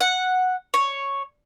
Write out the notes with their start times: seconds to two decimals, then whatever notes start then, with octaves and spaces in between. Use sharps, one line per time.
0.01 F#5
0.74 C#5